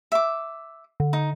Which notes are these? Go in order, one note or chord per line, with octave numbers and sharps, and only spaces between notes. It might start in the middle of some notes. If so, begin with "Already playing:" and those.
E5 D6
D3
D#4